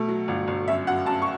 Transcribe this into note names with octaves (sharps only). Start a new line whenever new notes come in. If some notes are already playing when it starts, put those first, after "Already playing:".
Already playing: B2 A3
F#3
G1
G1
F#2 E5
F#2 F#5
F#2 A5
C#6